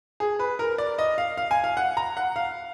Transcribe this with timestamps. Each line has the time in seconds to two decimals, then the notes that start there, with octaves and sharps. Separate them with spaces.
0.20 G#4
0.39 B4
0.59 A#4
0.78 D5
0.99 D#5
1.18 F5
1.37 F5
1.51 G#5
1.64 F5
1.77 F#5
1.97 A#5
2.17 F#5
2.36 F5